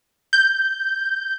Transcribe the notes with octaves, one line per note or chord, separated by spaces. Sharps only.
G6